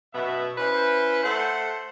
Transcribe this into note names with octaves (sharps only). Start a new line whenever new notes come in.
F#2 B2 B3 E5
C#4 E4 B4 C5
A3 A4 C5 F#5